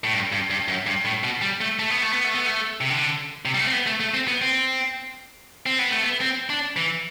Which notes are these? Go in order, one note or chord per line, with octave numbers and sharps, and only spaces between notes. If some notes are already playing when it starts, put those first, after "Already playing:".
A2
G2
G2
G2
F#2
G2
A2
B2
G3
A3
A3
B3
A3
B3
A3
B3
A3
C3
D3
C3
G3
A3
C4
B3
A3
A3
C4
B3
C4
C4
B3
A3
B3
C4
D4
E3